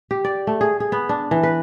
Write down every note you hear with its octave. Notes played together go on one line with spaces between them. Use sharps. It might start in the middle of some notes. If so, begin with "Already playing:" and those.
G4
D5
A3
G#4
G#4
B3
D4
E3
B4